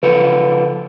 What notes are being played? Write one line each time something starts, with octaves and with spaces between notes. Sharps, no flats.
C#3 F3 A4 B4